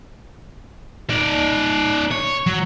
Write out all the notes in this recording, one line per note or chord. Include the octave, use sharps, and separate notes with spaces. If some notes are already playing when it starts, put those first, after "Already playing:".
D#4 D5
C#5
F#3